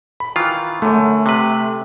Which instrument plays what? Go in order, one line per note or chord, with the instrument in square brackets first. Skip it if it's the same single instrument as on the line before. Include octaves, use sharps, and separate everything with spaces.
[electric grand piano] B5
[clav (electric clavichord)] D#3 E3 F4
[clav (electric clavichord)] F#2 D3 [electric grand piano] A3
[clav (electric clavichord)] C3 B4